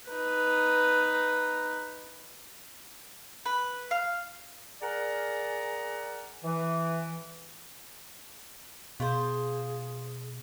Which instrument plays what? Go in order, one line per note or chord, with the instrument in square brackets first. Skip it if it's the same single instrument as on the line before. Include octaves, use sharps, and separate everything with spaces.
[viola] D#4 B4
[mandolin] B4
F5
[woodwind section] G#4 A#4 D5 F#5 A#5
E3
[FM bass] B2 [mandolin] F4 C5 [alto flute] G#4